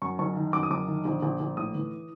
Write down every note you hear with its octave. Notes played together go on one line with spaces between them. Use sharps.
F#2 C#6
F#1 C#6
D#3
F#2 D6
D#6
F#1 D6
D#3
A#1
A#1
A#1
A2 D#6
E3